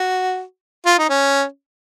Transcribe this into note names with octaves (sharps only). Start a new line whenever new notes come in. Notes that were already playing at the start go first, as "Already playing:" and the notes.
Already playing: F#4
F4
D#4
C#4